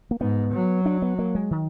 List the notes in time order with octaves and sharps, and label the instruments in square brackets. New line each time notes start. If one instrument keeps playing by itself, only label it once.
[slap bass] A#3
[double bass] G#2 [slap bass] B3
[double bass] F#3
[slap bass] D4
B3
A#3
G#3
D#3